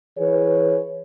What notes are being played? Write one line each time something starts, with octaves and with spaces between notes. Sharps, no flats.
E3 G#4 B4 C#5